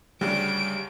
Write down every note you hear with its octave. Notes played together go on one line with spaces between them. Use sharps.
D2 C#3 G3 D4 D7